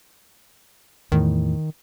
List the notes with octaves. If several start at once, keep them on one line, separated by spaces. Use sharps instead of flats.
E2 A2 D#3